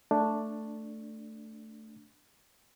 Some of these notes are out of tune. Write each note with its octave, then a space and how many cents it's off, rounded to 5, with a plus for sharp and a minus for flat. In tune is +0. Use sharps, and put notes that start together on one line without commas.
A3 +5 D4 +0